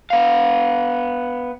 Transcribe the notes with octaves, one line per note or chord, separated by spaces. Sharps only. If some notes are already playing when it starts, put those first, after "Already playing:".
B3 F5